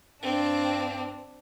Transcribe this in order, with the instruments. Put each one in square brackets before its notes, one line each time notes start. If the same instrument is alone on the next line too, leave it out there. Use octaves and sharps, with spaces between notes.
[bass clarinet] G2 [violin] C4 [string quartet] D4